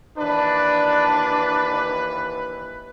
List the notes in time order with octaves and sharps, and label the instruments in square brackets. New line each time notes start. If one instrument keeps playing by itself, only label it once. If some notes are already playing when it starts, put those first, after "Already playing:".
[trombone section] D#2 E3 B4 [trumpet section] D4